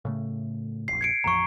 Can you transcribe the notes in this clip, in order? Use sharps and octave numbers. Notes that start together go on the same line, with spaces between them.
A2 C#3 A3
F1 A#1 C7
G#6 C#7 D7
A1 F2 F3 A#5 C#6